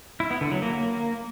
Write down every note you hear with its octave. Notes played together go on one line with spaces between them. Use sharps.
E4
B3
D3
F#3
A#3